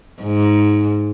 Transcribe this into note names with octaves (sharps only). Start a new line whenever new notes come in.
G#2